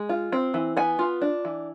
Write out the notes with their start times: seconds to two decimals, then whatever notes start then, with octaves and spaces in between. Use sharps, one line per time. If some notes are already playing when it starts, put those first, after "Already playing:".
Already playing: G#3
0.09 F4
0.32 C4
0.54 E3
0.77 B3 G#5
0.99 F4
1.21 D4
1.45 E3